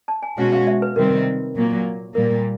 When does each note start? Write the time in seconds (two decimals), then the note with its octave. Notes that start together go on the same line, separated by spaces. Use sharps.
0.08 A5
0.23 G#5
0.37 B2 G#3 C#4 F#4 F#5
0.52 F5
0.67 E5
0.82 B4
0.96 C3 D#3 G3 C4 A#4
1.55 A#2 F#3 A#3
2.14 A#2 G3 A#3 A#4